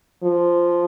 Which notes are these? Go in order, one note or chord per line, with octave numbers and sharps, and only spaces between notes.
F3